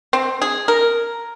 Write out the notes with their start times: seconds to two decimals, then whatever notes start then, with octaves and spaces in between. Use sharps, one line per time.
0.13 C4
0.42 G#4
0.68 A#4